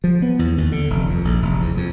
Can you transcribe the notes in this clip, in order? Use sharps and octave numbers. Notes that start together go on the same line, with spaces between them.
F3
B3
E2
D#2
D3
F1
F2
A#1
F1
E2
F2